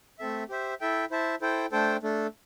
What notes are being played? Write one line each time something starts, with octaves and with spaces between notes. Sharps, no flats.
A3 C4 A4 E5
G4 C5 E5
E4 A4 E5 G5
E4 C5 E5 A5
E4 A4 C5 G5
A3 D4 A4 C5 G5
A3 D4 A4